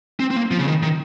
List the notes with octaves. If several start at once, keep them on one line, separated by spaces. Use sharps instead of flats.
C4
C4
A#3
F3
C#3
D#3
D#3